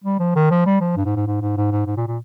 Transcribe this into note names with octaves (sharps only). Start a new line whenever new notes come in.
G3
F3
D#3
F3
G3
F3
G2
G#2
G#2
G#2
G#2
G#2
G#2
G#2
A#2
A#2